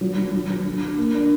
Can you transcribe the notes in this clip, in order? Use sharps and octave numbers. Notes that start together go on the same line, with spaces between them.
F#3
F#3
F#3
F#3
D3
D3
A#3
D4